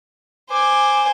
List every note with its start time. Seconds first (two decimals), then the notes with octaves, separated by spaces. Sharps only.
0.50 C5 G#5 D6